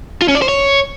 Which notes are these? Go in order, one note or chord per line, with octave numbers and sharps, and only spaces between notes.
F4
C#4
D5
C5
C#5